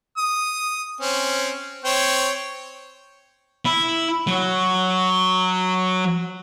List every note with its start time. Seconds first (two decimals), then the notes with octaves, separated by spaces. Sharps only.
0.17 D#6
1.01 C4 C#4
1.84 C4 C#5 G5
3.65 E4
4.27 F#3